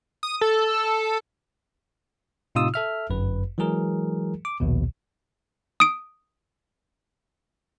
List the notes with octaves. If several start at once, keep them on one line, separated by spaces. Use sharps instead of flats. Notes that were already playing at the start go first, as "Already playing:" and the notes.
D#6
A4
A2 C3 D#4 F4 D#6 E6
A4 E5 F6
G1 F#2 B4
E3 F#3 G#3 G#4 A#4
D6
A#1 D#2 B2
D#6 D7